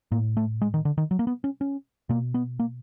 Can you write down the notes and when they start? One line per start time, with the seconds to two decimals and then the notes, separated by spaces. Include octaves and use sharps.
0.12 A2 A#3
0.37 A3
0.62 G#3
0.74 D#3
0.85 D3
0.98 D#3
1.11 F#3
1.19 A#3
1.27 B3
1.44 C#4
1.61 C#4
2.09 B2 A#3
2.34 B3
2.60 A#3